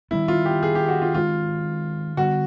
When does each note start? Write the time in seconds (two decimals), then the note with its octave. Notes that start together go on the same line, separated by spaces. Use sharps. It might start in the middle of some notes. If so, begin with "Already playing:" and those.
0.11 D#3 G3 B3 E4
0.28 F4
0.45 G4
0.63 G#4
0.75 G4
0.88 F#4
1.01 F4
1.14 D#3 G#3 C4 F4
2.17 D3 G3 B3 F#4